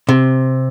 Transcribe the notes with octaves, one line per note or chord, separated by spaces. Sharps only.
C3